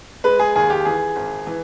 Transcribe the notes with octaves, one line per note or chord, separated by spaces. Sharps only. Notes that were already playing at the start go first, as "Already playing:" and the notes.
G#3 B4
G#4
D#2 G#4
G4
E3 G#4
G#1
E3